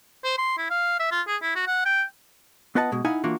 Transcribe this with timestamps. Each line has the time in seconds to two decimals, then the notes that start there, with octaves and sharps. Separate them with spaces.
0.24 C5
0.38 C6
0.58 E4
0.70 F5
1.00 E5
1.11 F4
1.28 G#4
1.43 E4
1.56 F#4
1.67 F#5
1.86 G5
2.75 B3 F4 B4 D#5 F#5 A5
2.92 B2 G#3
3.05 D#4 E4 F5 F#5 G#5
3.24 E3 A#3 D4 F4 F#4